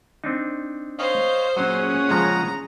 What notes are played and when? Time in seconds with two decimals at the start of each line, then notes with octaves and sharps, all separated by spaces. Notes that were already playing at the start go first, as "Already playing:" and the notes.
0.24 C4 D4 D#4
0.99 C5 C#5 D#5 F5
1.57 A#2 F#3 C#4 G#4 C#5 F#5 D#6
2.09 C#3 F3 G#3 A#5